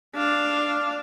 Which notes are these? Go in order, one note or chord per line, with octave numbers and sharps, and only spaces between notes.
D4 F5